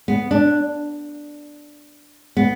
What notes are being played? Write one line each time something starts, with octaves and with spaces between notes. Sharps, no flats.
B3
D4
B3